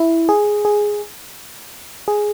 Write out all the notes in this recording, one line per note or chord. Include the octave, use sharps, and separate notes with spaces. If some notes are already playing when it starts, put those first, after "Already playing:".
Already playing: E4
G#4
G#4
G#4